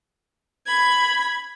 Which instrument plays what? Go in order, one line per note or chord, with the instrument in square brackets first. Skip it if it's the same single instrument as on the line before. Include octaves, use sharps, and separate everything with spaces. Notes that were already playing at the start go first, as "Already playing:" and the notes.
[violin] B5 G#6